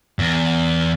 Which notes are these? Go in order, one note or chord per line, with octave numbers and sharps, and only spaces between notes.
E2